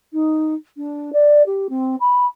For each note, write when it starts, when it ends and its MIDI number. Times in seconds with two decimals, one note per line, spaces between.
0.13 0.54 63
0.77 1.11 62
1.13 1.43 74
1.46 1.67 67
1.69 1.96 60
2.00 2.26 83